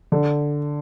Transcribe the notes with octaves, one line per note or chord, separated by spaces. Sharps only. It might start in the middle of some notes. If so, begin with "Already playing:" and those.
D3